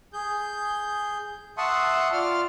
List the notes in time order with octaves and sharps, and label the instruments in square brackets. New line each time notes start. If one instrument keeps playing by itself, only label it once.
[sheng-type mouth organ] G#4 G6
E5 F#5 A5 C6 C#6 D#6
F4 D5 C6 F6